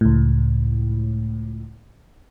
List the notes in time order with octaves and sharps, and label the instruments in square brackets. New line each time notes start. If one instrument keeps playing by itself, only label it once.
[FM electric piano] C#2 A2